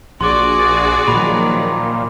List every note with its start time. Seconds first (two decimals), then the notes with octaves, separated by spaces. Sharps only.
0.21 A#1 F#4 G#4 D5 C6 D6
1.08 A#2 D#3 F3 F#3 B5